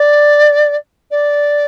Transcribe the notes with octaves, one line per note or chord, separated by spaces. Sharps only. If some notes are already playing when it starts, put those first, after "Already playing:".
Already playing: D5
D5